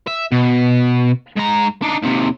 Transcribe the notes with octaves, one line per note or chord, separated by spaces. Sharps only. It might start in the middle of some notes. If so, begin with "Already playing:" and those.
E5
B2
G#2 A#5
D4 D#4
D#2 C3